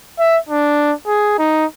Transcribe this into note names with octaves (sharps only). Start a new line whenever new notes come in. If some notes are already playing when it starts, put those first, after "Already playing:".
E5
D4
G#4
D#4